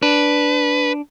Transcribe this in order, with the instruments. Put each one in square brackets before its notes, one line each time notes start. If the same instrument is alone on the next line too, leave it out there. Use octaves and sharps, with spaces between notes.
[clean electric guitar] D4 [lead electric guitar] B4